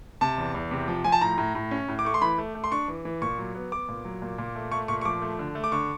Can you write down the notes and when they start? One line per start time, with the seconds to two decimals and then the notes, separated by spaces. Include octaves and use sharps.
0.21 C3 A5
0.38 E2
0.55 E2
0.71 C3
0.88 F3
1.04 F3 G#5
1.12 A5
1.21 A2 A#5
1.38 A2
1.55 A2
1.71 C#4
1.88 A2
1.99 D6
2.05 A3 C#6
2.14 C6
2.22 E3 B5
2.38 A3
2.55 A3
2.64 C6
2.72 D4 C#6
2.88 E3
3.05 E3
3.22 A#2 C#6
3.38 F#3
3.55 B3
3.72 B3 D6
3.89 A#2
4.05 F#3
4.22 A#2
4.38 A#2
4.55 A3
4.72 A3 C#6
4.88 A#2 C#6
5.01 C#6
5.05 F3 D6
5.22 A3
5.39 D3
5.55 A3
5.64 D6
5.72 D3 C#6